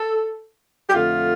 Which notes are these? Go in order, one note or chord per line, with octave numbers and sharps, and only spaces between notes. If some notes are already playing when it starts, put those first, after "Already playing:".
Already playing: A4
G4
F2 D3 A3 F4